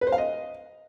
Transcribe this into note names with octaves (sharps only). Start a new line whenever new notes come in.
B4
C5
F5
D#5